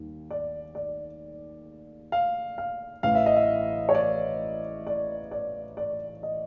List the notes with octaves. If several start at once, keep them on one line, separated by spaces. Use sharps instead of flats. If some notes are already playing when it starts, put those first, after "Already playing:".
Already playing: D#2 D#3 G3
D5
D5
F5
F5
A1 A2 E3 F5
E5
D#5
E5
C#5
D5
D5
D5
D5
D#5